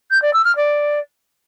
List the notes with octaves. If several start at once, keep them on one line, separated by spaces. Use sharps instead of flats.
G6
D5
E6
F6
D5